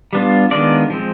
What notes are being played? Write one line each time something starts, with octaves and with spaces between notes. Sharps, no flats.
G3 B3 D4 F4
D#3 G#3 B3 D4 F4 D5
F3 G#3 C4